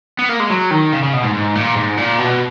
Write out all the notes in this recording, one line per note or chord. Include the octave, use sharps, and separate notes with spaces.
B3
A#3
G#3
F#3
D#3
C#3
C#3
B2
G#2
G#2
A#2
G#2
A#2
B2